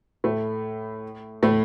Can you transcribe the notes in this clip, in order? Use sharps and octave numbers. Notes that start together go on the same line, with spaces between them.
A2 A3
A2 A3